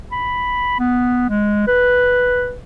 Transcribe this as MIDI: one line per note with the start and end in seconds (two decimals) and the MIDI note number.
0.12 0.75 83
0.79 1.28 59
1.29 1.65 56
1.68 2.55 71